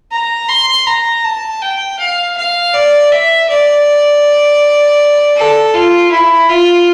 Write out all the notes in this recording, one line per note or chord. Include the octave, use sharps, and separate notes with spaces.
A#5
C6
A#5
A5
G5
F5
F5
D5
E5
D5
A4
F4
E4
F4